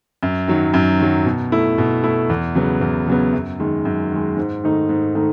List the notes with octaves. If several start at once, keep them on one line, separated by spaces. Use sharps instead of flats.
F#2
D#3 F#3
F#2
D#3 F#3
B2
A3 E4
B2
A3 E4
E2
C#3 F#3 B3
E2
C#3 F#3 B3
F#2
D#3 G#3
F#2
D#3 G#3
G#2
D#3 A3 D#4
G#2
D#3 A3 D#4